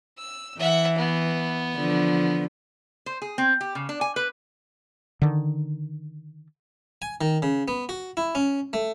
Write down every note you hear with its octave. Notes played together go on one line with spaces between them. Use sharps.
E6
E3 E5 F#5
B3
D3 F3
C5
G#4
C4
G4
C#3
D4
G#5
B4
D3 D#3
G#5
D#3
C#3
B3
F#4
E4
C#4
A3